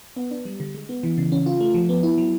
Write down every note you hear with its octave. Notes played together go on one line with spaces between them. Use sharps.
B3
D4
G3
D3
G#3
B3
E3
C#3
C#4
F4
A3
F3
B3
E4
F#3